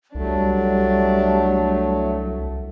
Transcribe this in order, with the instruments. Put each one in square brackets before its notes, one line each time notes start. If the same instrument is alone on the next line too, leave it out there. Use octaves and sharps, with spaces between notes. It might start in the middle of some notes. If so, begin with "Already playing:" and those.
[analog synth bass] C2 [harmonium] F#3 A3 [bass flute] G3 [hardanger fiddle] D4